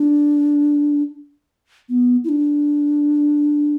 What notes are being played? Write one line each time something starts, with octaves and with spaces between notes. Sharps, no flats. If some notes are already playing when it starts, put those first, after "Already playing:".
Already playing: D4
B3
E4
D4